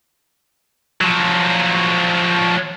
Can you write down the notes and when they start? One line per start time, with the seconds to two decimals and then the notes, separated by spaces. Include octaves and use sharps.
1.01 F3 F#3